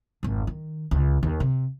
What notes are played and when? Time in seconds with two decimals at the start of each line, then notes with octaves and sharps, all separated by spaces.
0.23 G#1 F2
0.47 D#3
0.91 C#2
1.23 D#2
1.40 C3